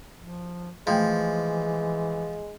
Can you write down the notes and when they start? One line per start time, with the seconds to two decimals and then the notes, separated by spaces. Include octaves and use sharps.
0.19 F3
0.87 E3 F3 G#3 A3 G5 B5